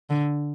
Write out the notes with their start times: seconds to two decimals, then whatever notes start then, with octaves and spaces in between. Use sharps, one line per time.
0.10 D3